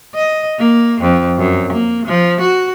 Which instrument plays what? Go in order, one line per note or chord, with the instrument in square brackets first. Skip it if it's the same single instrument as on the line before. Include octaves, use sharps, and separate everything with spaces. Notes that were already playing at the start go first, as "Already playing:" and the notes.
[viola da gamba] D#5
A#3
F2
F#2
A#3
F3
F#4